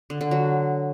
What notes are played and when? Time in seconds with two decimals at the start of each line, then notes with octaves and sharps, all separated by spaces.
0.10 D3
0.21 D3
0.31 F#3